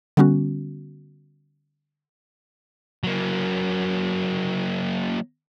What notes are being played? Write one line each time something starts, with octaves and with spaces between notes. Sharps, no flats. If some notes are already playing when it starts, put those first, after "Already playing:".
D3 G3 B3 C#4 F#4
F#3 A#3